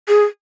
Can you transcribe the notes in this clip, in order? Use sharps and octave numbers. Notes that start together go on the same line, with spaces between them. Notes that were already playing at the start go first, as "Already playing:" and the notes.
G#4